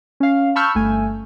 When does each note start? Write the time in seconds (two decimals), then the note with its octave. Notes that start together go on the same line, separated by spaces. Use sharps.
0.20 C#4 F5
0.56 A5 B5 C#6 E6 F6 G6
0.75 G1 A3 G#5